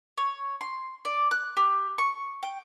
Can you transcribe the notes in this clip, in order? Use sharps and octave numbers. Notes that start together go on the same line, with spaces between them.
C#5
C6
D5
F#6
G4
C#6
G5